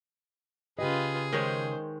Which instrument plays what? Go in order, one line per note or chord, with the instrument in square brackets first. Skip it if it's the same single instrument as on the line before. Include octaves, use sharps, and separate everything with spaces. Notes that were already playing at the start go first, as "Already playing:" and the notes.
[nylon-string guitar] C#3 G4 D#5 [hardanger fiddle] F4 B4 [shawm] G#4
[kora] D#3 G#3 C#5 [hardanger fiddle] C5